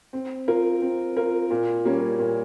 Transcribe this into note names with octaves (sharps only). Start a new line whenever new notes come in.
C4
F4 A#4
C4
F4 A#4
A#2
G3 A#3 C#4
A#2